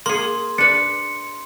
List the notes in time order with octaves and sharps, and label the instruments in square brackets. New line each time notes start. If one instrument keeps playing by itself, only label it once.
[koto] A#3 G#4 [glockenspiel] C6
[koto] D4 B4 [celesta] C#7